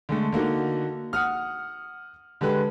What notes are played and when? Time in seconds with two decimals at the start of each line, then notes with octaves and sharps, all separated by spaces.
0.09 D3 G#3 A3
0.32 D3 A#3 D#4 F#4
1.13 F#5 D#6 F6
2.41 D3 G#3 G4 B4